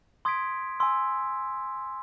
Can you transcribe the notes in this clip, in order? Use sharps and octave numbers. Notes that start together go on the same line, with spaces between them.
C6 D#6 G#6 B6 D7
G#5 C6 E6